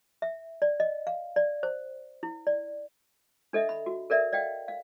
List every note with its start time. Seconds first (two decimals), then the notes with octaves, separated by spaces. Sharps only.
0.22 E5
0.62 D5
0.80 D#5
1.07 F5
1.36 D5
1.63 C5
2.23 E4
2.47 D5
3.53 D4 A4 D#5 E5
3.69 B5
3.86 F#4
4.10 A4 A#4 D5 E5
4.32 D5 D#5 F5 G5
4.68 F5